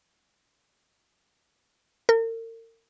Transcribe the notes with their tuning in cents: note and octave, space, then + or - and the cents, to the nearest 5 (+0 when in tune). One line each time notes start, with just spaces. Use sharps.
A#4 -40